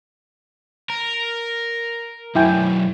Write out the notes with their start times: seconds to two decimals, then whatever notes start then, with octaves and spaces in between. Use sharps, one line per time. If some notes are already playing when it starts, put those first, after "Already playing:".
0.90 A#4
2.36 B1 F#2 E4 G5 G#5